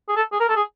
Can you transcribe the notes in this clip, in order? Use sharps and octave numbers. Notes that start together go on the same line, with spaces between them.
G#4
A4
G#4
A#4
A4
G#4